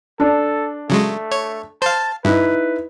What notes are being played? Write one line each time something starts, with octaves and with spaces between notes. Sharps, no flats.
D4 A4 D5
C#3 F#3 G#3 A3
C#5
C5 F5 A5
G2 D#4 E4 B4